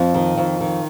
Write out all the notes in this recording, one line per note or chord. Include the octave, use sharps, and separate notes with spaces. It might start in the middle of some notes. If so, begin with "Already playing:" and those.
Already playing: F2
D#3
F2
D#3